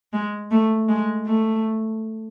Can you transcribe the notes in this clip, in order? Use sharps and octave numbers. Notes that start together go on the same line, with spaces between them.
G#3
A3
G#3
A3